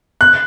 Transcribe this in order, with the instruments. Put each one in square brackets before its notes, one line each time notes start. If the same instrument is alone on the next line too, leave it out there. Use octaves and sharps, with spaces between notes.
[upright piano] F#6